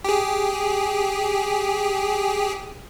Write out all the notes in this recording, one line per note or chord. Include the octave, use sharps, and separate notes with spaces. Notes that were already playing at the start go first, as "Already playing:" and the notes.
G4 G#4